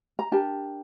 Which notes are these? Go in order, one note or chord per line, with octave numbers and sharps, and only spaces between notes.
A#5
D4 G4 A#4 A5